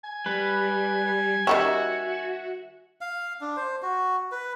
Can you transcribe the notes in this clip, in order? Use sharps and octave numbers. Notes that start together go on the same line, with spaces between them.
G#5
G3 B4
D#3 G3 C#4 F#4 E5
F5
D4
C5
F#4
B4